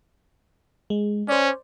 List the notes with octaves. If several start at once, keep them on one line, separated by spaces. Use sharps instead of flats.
G#3
C#4 C5 D5